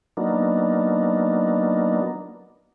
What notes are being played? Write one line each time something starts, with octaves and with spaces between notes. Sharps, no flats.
F#3 A#3 B3 D4 D#4